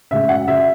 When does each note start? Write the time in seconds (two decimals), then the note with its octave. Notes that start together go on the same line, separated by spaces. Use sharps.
0.11 C#3 G#3 E5
0.29 F#2 F#5
0.47 C#3 F#3 E5